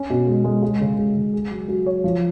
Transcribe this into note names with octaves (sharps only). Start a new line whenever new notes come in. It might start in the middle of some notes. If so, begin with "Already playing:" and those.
Already playing: C#4
B2
G#3
G#3
G#3
C#3
G#3
C#3
G#4
F#3
F#3
C#5
F3